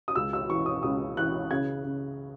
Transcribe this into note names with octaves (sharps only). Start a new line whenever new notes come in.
D#6
C#2 E6
E6
E3 C#6
D#6
C#2 D#6
E3 F#6
C#3 G#6
C#3